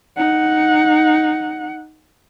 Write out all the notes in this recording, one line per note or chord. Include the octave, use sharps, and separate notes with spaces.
D#4 F#5